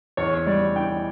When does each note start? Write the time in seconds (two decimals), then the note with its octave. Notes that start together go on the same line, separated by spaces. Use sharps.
0.17 E2 C#5
0.46 G3 D5
0.76 E3 G5